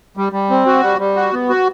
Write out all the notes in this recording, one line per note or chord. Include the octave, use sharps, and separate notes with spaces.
G3
G3
C4
F#4
G3
G3
F#4
B3
F#4